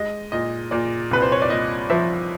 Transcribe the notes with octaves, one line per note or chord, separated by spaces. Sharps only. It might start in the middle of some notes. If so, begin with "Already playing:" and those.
Already playing: G#3 D#5
A#2 D#5
A#2 D5
C2 B4
C5
C#5
D5
A#2 D#5
F3 E5